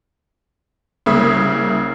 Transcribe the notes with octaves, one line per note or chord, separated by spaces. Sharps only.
C2 C#3 A#3 E5 D#6 G#6